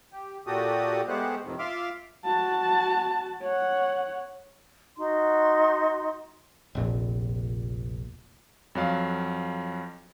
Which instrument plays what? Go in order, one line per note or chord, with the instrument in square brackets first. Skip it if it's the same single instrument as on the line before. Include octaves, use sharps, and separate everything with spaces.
[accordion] G4
A#2 F#4 G4 A4 D#6
G#3 A3 B3 G4 C5 F#5
F2 A2 C3 D#3
F4 E5 C6 D6 F6
[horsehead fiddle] F#4 A5
C#5 F#5
[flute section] D#4 F#4 C6
[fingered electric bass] F1 A#1 A#2
[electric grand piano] F2 F#3 F5